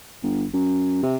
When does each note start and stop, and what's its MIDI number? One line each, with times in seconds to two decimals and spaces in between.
0.22 0.44 31
0.53 1.02 42
1.03 1.16 48